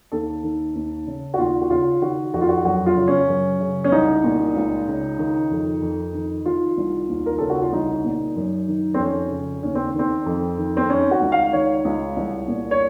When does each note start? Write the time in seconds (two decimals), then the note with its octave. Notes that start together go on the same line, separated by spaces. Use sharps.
0.12 D#2 A4
0.43 D#3
0.75 D#2
1.07 C#3
1.34 F#4
1.38 D#2 F4
1.61 F#4
1.70 C#3 F4
2.01 D#3 F#4
2.34 F2 F#4
2.41 F4
2.49 F#4
2.65 F#2 F#4
2.86 F4
2.97 C#3
3.08 C#4
3.29 F#2
3.60 C#3
3.84 C#4
3.92 C2 D#4
4.24 A#2
4.56 C#2
4.87 C#3
5.18 D#3
5.51 F2
5.82 F2
6.14 D#3
6.46 D#3 F4
6.78 C2
7.09 D#2
7.26 A#4
7.38 C#3 A4
7.50 F#4
7.62 F4
7.73 C2 D#4
8.04 A#2
8.36 F#2
8.68 D#3
8.94 C4
8.99 F2 C#4
9.31 C#3
9.63 D#2 C#4
9.75 C4
9.94 D#3 C4
10.26 F2
10.58 D#3
10.77 C4
10.89 D#3 C#4
11.11 F#4
11.22 C#2
11.32 F5
11.53 D#3 C#5
11.85 C#2
12.17 C2
12.48 A#2
12.71 C#5